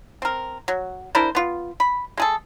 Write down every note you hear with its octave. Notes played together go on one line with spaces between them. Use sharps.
C4 A#4
F#3
D4 E4 A#4 C5
B3 F4
B5
G#3 G#4 A4